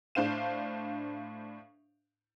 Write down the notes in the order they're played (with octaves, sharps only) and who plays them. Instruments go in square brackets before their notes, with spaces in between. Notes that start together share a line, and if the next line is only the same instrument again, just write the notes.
[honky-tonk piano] A2 D4 C5 F5 E7